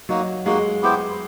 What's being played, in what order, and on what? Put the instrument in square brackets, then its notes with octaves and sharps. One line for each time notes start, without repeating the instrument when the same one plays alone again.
[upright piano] F#3 [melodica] A#3 D#4 F#4
[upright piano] G#3 [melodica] A#3 D#4 F#4
[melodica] B3 E4 G4 C5